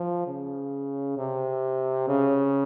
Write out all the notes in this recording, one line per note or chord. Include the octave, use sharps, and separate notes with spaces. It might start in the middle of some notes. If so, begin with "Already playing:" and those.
Already playing: F3
C#3
C3
C#3